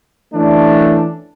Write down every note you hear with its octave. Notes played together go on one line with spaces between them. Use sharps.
E3 A3 C#4 D4